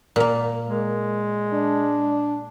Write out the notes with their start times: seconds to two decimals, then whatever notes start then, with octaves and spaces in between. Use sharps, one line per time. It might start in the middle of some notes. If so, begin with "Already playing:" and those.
0.16 A#2 A#3
0.66 G#3
1.53 D4